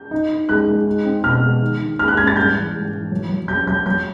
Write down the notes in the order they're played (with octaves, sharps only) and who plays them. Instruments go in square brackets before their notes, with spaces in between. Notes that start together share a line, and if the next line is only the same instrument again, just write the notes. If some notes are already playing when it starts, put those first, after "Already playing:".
Already playing: [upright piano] G6
[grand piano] D#4
D#4
[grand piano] G#3 [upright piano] F#6
[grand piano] G#3
D#4
C4
[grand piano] B2 [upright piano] F6
[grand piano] G#3
D#3
D#3
[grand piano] G#3 [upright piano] F6
[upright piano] F#6
[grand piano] G#2 [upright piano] G#6
[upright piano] A6
[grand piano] G3 [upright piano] G6
[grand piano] E3
G#2
E3
F#3
F#3
[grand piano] F#3 [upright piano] G6
[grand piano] F#3 [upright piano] G6
[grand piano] F#3 [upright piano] G6